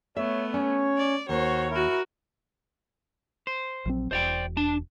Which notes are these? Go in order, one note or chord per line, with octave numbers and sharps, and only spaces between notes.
A3 B3 C#5 E5
C#4 C#5
D5
D#2 F#4 C5 C#5
E4 F#4 A#4
C5
A#1 F#3 C4
E1 C5 D5 G5
D4 A5